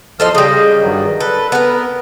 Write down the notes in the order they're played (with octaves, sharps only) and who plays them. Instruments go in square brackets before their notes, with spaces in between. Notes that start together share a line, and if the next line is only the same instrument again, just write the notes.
[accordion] E2 F3 F6 [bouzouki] A4 C5 D#5
[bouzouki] C#3 G3 [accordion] D#5
[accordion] G2 D#3 F#3
[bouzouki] A4 [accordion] B4
[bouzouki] B3 A#4